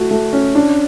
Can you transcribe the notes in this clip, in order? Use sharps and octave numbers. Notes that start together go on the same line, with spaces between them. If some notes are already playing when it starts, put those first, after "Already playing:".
Already playing: A3 F#4
A3
C#4
D4